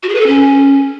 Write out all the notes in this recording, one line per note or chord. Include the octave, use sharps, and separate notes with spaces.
F#4
G#4
B4
A4
C#4